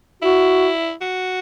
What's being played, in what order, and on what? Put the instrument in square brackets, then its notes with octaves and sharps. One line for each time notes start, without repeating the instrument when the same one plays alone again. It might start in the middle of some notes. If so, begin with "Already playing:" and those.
[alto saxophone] E4 [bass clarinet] F#4
[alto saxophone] F#4